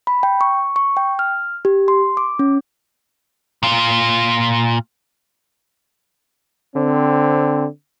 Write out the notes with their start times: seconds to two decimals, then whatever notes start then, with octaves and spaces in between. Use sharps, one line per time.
0.07 B5
0.23 G5
0.41 C#6
0.76 C#6
0.97 G5
1.19 F6
1.65 G4
1.88 C6
2.17 D6
2.39 C#4
3.63 A#2 F4
6.75 D3 C4